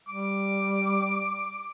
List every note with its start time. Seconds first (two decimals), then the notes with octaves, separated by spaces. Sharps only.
0.08 G3 D6